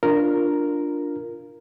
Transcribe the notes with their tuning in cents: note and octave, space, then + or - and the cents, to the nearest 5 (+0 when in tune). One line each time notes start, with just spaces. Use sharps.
D4 +0 F4 -5 A#4 +0